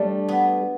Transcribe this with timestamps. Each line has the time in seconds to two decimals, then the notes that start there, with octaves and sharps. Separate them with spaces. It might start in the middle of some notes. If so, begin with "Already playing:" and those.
Already playing: G3 A3 D4
0.29 B3